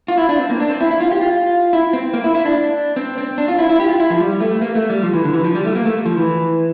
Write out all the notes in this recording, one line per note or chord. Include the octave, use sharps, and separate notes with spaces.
F4
E4
D4
C4
A#3
D4
C4
E4
E4
F4
G4
F4
E4
C4
A#3
E4
E4
D4
C4
C4
D4
F4
E4
E4
G4
F4
E4
F3
G3
A3
A#3
A3
G3
F3
E3
D3
E3
F3
G3
A3
A#3
A3
F3
E3